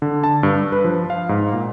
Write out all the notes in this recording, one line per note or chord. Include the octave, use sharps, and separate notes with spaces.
D3
A5
G2
D4
B4
F3
F5
G#2
A#2